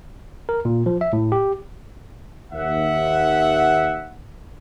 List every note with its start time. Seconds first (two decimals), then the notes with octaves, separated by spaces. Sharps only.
0.49 A#4
0.65 A#2
0.86 F3
1.01 E5
1.13 A2
1.32 G4
2.52 D#2 E5 F#5